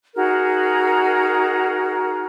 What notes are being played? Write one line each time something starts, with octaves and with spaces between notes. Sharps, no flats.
D#4 F#4 G#4 A#4